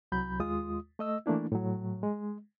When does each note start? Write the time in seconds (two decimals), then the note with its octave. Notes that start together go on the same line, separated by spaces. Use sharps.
0.12 C2 F#3 B5 G6
0.40 D#2 G#3 F4 D#6
0.99 A3 D#5 E6
1.26 E3 A3 A#3 D4 E4
1.52 A2 F#3
2.03 G#3